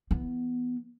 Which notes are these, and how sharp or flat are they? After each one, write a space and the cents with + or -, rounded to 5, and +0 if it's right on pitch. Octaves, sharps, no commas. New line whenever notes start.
E3 +0 B3 +5